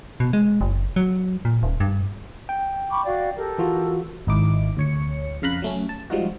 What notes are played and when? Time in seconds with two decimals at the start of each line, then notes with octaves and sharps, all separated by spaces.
0.20 B2
0.33 G#3
0.61 F#1
0.96 F#3
1.45 A#2
1.63 D#1
1.80 G2
2.49 G5
2.91 B5 C#6 D6
3.05 F#4 D5 F5
3.37 G4 A4 A#4
3.58 E3 F4 F#4
4.27 G#1 D#4 E4 D6
4.77 D2 C#5 C#7
5.42 F2 C#3 F5 A#5 B5 F#6
5.62 F#3 A3 C#4
5.89 A5
6.10 F3 G3 G#3 D#4 F4 F#4